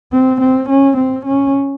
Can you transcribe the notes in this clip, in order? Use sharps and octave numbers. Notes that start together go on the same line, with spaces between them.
C4
C4
C#4
C4
C#4